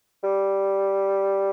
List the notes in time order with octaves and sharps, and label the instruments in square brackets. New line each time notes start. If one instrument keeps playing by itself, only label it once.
[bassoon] G3